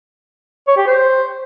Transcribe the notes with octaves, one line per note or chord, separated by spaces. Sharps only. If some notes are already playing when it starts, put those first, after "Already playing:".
C#5
G4
C5